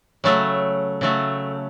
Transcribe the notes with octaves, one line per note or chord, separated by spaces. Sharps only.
C#3 F#3 A3
C#3 F#3 A3